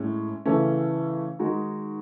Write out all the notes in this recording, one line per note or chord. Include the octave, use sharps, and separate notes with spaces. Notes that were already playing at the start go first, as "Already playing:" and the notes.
Already playing: A2 G#3 C#4
C#3 E3 A3 C#4
D#3 G#3 D#4 F#4